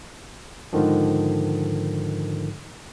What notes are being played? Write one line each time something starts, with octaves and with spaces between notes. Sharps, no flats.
G#2 D3 D#3 F3